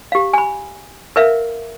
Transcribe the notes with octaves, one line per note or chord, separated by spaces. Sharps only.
G4 F5
G#5 B5
A#4 B4 E5 F5